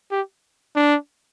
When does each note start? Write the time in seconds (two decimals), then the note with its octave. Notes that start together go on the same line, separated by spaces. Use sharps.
0.11 G4
0.76 D4